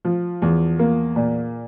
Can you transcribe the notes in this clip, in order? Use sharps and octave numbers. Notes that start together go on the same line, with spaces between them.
F3
E2
A#3
A#2